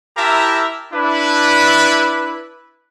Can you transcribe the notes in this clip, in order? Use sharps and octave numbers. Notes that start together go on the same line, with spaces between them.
E4 G4 A#4 E5 A5 A#5
D4 E4 B4